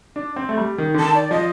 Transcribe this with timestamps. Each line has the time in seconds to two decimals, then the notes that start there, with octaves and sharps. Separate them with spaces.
0.16 D4
0.36 C4
0.49 A3
0.57 G3
0.78 D#3
0.94 D3
0.99 D#3 A5
1.15 D5
1.31 F3 D#5